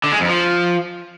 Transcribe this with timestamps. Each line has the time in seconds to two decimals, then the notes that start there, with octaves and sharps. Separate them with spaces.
0.04 D3
0.12 G#3
0.20 F2
0.28 F3